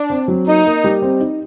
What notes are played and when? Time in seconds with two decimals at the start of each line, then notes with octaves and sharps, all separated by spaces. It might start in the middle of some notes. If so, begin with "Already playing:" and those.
Already playing: D4
0.10 C4
0.28 F#3
0.47 A#3 D#4
0.65 A#3
0.84 G3
1.02 C4
1.20 D#4